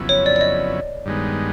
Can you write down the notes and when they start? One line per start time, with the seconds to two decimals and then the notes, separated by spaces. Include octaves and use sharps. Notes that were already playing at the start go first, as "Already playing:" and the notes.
Already playing: F2 C#3 F#3 B3 E4
0.09 C#5
0.26 D5
0.36 D5
0.41 D#5
1.06 G2 D#3 G#3 B3